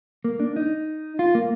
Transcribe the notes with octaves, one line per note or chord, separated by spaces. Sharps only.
A#3
D4
D#4
F4
A#3